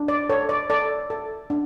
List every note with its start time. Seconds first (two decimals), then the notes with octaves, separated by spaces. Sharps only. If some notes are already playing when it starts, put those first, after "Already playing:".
Already playing: D4
0.08 D5
0.29 A4 C#5
0.49 D5
0.70 A4 D5
1.10 A4
1.50 D4